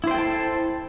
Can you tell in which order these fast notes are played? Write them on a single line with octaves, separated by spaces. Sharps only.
E4 C5 G5 A4 A5